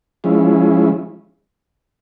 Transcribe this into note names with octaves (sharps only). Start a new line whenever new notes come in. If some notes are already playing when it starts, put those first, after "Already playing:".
F3 G#3 C#4 E4